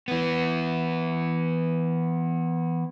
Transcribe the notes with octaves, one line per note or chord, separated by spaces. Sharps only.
E3 B3